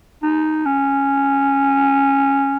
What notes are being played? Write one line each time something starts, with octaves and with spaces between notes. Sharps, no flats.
D#4
C#4